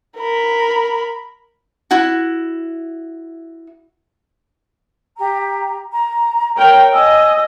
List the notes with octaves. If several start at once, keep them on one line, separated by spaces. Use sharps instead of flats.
A#4 B5
E4 F#4
G4 A#5
A#5
A#4 C#5 G5
D#5 G#5 E6